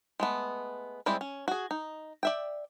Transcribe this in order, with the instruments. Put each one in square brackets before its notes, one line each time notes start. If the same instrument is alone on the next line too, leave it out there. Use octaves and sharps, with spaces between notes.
[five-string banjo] G#3 A3 B3
G3 G#3 C4 E4 G4
C#4
F#4 G#4
D#4
D5 E5 G5